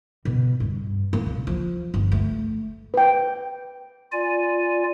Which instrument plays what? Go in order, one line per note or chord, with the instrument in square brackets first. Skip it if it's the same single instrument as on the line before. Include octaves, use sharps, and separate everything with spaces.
[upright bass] B2
G2
A#3
B1
F3
G1
A3
[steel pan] B4 G5
[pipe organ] F4 D5 G#5